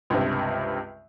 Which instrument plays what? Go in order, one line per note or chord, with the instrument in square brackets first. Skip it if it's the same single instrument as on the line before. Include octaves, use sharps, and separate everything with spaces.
[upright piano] C#2 G2 C3